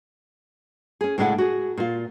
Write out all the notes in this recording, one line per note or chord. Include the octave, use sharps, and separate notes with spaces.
C#4 G#4
A2 C#3 G#3 D4 D#5 F#5
F#4 G#4
A#2 F4